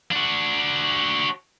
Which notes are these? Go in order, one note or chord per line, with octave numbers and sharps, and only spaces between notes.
D4 F#4